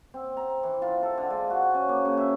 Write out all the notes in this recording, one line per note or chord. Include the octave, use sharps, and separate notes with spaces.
C4
A#5
E3
F4
A4
D3
G#3
F#4
C#4
A#3
C#3
E5